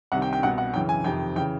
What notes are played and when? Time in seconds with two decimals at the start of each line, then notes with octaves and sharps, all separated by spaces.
0.12 C2 C3 D#3 F#5
0.22 G5
0.33 G5
0.43 C2 B2 F#5
0.58 F#5
0.74 F#2 C#3 E3 G5
0.89 G#5
1.04 F2 C3 D#3 G5
1.36 C#3 E3 G5